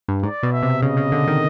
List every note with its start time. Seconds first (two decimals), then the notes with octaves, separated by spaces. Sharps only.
0.08 G2
0.23 G#2 D5
0.43 B2
0.53 E5
0.63 C3
0.82 C#3 D#5
0.97 C#3
1.12 D3
1.27 D#3